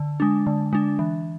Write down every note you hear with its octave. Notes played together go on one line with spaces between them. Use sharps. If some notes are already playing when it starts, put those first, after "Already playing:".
Already playing: D3
G#3 D4
D3
G#3 D4
E3